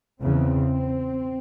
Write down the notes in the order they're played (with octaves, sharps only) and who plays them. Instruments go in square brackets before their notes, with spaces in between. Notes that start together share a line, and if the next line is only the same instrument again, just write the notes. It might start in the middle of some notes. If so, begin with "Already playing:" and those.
[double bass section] E2 C#3 C4